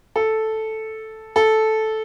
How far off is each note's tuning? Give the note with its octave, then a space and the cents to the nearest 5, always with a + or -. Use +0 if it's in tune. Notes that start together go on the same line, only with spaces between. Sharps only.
A4 -5
A4 -10